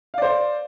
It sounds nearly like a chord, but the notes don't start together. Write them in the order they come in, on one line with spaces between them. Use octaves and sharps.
F5 D5 C5